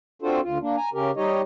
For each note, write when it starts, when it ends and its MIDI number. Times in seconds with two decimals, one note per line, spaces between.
0.22 0.40 60
0.22 0.40 62
0.22 0.40 65
0.22 0.40 66
0.22 0.40 69
0.22 0.40 72
0.43 0.58 38
0.43 0.58 65
0.61 0.76 58
0.61 0.76 62
0.77 0.89 80
0.77 0.89 82
0.94 1.11 49
0.94 1.11 61
0.94 1.11 67
0.94 1.11 70
1.17 1.42 55
1.17 1.42 63
1.17 1.42 67
1.17 1.42 73
1.17 1.42 75